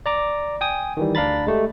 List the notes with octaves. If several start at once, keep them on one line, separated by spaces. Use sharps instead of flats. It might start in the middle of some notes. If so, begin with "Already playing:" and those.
D5 A#5 D6
G5 G#5 D#6
D#3 E3 G3
D2 D4 F5 A#5 B5 A6
G#3 A3 G4